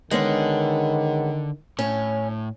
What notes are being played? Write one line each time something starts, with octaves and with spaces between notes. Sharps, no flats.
D3 D#3 G#3 B3 C#4
A2 C#4